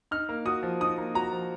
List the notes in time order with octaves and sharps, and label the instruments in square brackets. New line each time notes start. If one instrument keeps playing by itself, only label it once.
[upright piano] D#4 [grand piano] F6
[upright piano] A#3
[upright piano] F#4 [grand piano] D#6
[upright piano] F3
[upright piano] D#4 [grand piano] D#6
[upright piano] A#3
[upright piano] F#4 [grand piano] A#5
[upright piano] F3